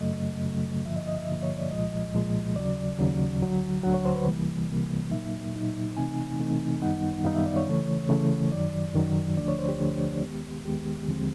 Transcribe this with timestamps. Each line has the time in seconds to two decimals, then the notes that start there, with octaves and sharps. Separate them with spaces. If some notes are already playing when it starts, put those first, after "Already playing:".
0.01 F#2 C#3 F#3 A3 D#5
0.43 F#2 C#3 F#3 A3
0.86 G2 D3 F3 A#3 E5
0.96 D#5
1.07 D#5
1.18 E5
1.29 G2 D3 F3 A#3
1.43 C#5
1.57 D5
1.70 C2 A#2 F3 G#3 D#5
2.13 C2 A#2 F3 G#3
2.56 D#2 C#3 F#3 D5
2.99 D#2 C#3 F#3
3.41 D2 D3 F#3
3.83 D2 D3 F#3 F#5
3.94 C#5
4.05 C5
4.16 B4
4.26 C2 C3 E3 G3 A#3
4.69 C2 C3 E3 G3 A#3
5.11 A#2 F#3 A#3 D#4 E5
5.54 A#2 F#3 A#3 D#4
5.96 C3 E3 A3 C4 D#4 G#5
6.39 C3 E3 A3 C4 D#4
6.81 F#2 D#3 G3 B3 D#4 F#5
7.24 F#2 D#3 G3 B3 D#4 F5
7.35 E5
7.46 D5
7.56 C#5
7.67 C#3 E3 A3
8.09 C#3 E3 A3
8.52 F#2 D#3 F#3 D5
8.94 F#2 D#3 F#3
9.37 D2 D3 F3 A3 D4 D5
9.48 C#5
9.59 C5
9.68 G4
9.79 D2 D3 F3 A3 D4
10.22 D#2 D#3 G#3 B3
10.64 D#2 D#3 G#3 B3 G4
11.08 D#2 D3 F3 G#3 C4